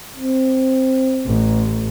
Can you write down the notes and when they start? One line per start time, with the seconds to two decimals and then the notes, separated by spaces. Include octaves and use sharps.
0.17 C4
1.26 A1